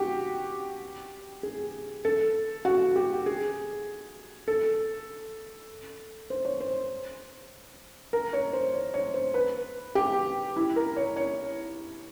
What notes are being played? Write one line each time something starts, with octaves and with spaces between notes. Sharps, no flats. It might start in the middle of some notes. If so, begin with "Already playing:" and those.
Already playing: F#4 G4
G#4
A4
F#4
G4
G#4
A4
C5
C#5
C5
A#4
C#5
C5
C#5
C#5
C5
B4
G4
E4
A#4
C#5
C#5